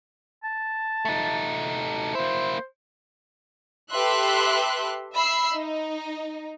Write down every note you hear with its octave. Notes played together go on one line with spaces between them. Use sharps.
A5
A3 D#4
A#3 E4 C5
G4 A4 B4 E5 C6 F#6
E5 B5 E6 C7
D#4